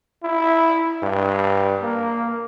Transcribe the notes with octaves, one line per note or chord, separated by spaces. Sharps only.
E4
G2
A#3